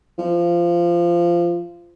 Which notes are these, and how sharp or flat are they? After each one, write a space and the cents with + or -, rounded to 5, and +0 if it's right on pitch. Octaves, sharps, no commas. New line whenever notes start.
F3 -15